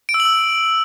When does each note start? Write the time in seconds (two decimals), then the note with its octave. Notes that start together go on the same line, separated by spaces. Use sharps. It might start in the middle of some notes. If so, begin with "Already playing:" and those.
0.09 D7
0.14 E6
0.20 F#7
0.25 E6